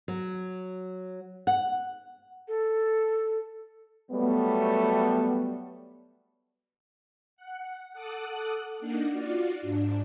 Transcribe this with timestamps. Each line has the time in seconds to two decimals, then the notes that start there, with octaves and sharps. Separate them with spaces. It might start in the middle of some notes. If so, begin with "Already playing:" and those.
0.08 F#3
1.47 F#5
2.48 A4
4.11 F#3 G3 A3 B3
7.36 F#5
7.93 A4 F#5 D6 D#6 F#6
8.79 A#3 D4 D#4 F#5
9.09 F4 F#4 D5
9.61 G#2 D4